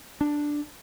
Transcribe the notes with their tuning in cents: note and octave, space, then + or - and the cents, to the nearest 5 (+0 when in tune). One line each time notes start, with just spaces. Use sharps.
D4 +5